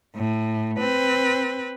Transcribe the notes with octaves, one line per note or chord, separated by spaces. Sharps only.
A2
C4 B4